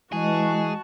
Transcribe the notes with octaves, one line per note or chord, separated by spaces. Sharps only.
E3 G#3 F#4 G#4 D#5 A5